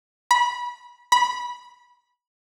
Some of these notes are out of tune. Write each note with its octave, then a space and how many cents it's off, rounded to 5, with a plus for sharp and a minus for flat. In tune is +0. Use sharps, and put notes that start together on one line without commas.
B5 -25
B5 -20